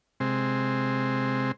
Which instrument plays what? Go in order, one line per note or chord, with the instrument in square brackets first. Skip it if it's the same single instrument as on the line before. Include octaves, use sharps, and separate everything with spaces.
[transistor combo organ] C3 G#3 C4